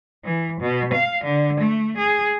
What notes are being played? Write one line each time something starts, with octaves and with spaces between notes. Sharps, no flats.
E3
B2
F5
D3
A3
G#4